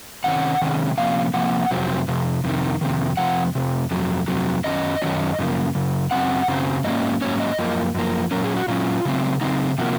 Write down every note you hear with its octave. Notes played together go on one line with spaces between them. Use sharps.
C3 D#3 C#4 F#5
C3 D#3 G#3 C#4
C3 F3 A#3 C#4 F5
C3 F3 A#3 F#5
F2 C3 F#3 C4
F2 C3
F2 C3 D#3
F2 C3 D#3
F2 C3 F3 F#5
F2 C3
F2 C3 F#3
F2 C3 F#3
F#2 D#3 F#3 C#4 D#5
F#2 D#3 F#3 C#4
F#2 C#3 F3 A#3
F#2 C#3
F#2 C#3 F#3 C4 F#5
F#2 C#3 F#3 C4
G#2 F#3 A#3 C#4 D#5
G#2 F#3 A#3 C#4 C#5
D#5
F#2 F3 A#3
F#2 F3 A#3
A#2 F#3 C#4 A#4
G#4
F#4
A#2 F#3 C#4 F4
C#3 F#3 C4
C#3 F#3 C4 D#4
C3 F3 A#3 F#4